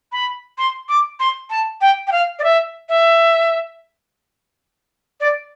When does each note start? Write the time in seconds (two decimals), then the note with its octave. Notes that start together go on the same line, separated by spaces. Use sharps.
0.12 B5
0.58 C6
0.89 D6
1.20 C6
1.50 A5
1.81 G5
2.07 G5
2.12 F5
2.39 D5
2.44 E5
2.89 E5
5.20 D5